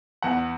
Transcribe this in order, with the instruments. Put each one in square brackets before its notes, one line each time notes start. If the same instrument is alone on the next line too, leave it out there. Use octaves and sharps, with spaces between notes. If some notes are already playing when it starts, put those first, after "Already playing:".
[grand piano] E2 F#5